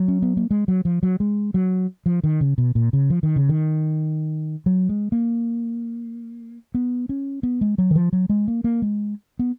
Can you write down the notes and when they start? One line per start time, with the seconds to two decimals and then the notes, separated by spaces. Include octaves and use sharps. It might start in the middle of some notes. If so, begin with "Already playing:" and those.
Already playing: F#3
0.08 C#4
0.22 B3
0.37 A#3
0.51 G#3
0.68 F#3
0.85 F3
1.03 F#3
1.20 G#3
1.54 F#3
2.06 F3
2.24 D#3
2.41 C#3
2.58 B2
2.75 A#2
2.93 C#3
3.10 F3
3.23 D#3
3.36 C#3
3.49 D#3
4.66 F#3
4.89 G#3
5.12 A#3
6.74 B3
7.09 C#4
7.43 B3
7.61 G#3
7.78 F#3
7.91 D#3
7.95 F3
8.13 F#3
8.29 G#3
8.48 A#3
8.64 A#3
8.82 G#3
9.39 B3